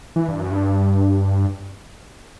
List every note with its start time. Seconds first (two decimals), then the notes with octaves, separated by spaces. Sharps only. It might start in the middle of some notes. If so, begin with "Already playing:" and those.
0.16 E3
0.29 G2
0.40 F#2
0.51 G2